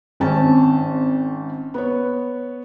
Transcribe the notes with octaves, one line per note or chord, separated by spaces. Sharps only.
G#1 C4 C#4 A5
B3 C#5